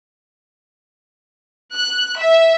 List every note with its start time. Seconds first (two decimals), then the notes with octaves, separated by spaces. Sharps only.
1.75 F#6
2.20 E5